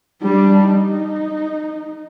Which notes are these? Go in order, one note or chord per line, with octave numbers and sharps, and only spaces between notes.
G3 D4
D#4